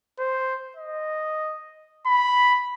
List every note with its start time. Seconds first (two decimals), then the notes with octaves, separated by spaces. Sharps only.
0.19 C5
0.77 D#5
2.06 B5